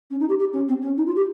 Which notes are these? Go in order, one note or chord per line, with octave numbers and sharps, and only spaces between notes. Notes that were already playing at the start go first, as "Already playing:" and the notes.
C#4
D#4
G4
G4
C#4
C4
C#4
D#4
F4
G4